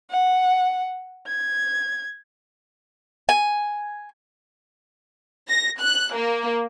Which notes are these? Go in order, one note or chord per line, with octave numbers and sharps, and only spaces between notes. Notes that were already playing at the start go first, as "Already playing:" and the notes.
F#5
G#6
G#5
A#6
F#6
A#3